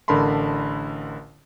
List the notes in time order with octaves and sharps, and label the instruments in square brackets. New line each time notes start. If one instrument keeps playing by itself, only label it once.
[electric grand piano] A1 D3 A#4 A5 B5 C6